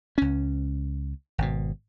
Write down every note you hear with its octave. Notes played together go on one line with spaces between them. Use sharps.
C#2 C#4
G#1 B2